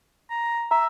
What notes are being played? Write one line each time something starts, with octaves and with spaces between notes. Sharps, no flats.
A#5
E5 A#5